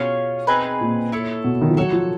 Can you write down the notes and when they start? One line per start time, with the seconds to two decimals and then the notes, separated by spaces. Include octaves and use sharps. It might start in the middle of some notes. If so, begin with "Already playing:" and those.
Already playing: B2 C#4 F4 G#4 C#5
0.47 C4 D#4 G#4 B4
0.81 A#2
1.12 E4 A4 C#5
1.44 B2
1.61 D#3
1.69 F3
1.77 F#3 F#4 A4 C#5
1.93 F3